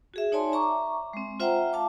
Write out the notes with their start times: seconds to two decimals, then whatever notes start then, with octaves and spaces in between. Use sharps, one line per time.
0.14 F#4 G#4 E5
0.32 D#4 C#5 D5 G#5 A5 C6
0.52 E5 A#5 C#6 D6
1.13 G#3 C4
1.40 F4 C5 E5 F#5 G5 A#5
1.73 F5 A5 D6